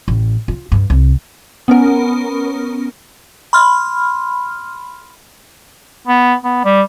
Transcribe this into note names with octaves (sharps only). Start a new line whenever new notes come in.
A1
F4
G2
C2
B3 C#4 A#4
B5 C6 F6
B3
B3
G3